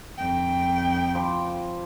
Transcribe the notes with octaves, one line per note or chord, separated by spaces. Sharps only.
F2 G5
F3 B5 D6